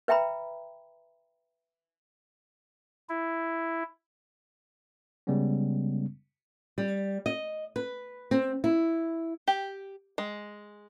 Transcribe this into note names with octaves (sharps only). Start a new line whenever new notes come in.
B4 E5 G5 A#5 B5
E4
C#3 G3 G#3 B3 C#4
G3
D#5
B4
C4
E4
G4
G#3